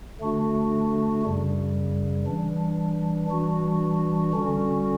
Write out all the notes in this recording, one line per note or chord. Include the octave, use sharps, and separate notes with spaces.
D3 A3 D4 F#4
F#2 C#3 G3
E3 G3 D4
E3 G3 D4 F#4
D3 G3 C#4 F#4